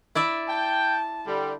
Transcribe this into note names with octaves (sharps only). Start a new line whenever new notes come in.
E4 D5 E5
G5 A5
D3 G3